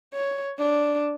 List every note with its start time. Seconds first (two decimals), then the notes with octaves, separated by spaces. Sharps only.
0.14 C#5
0.58 D4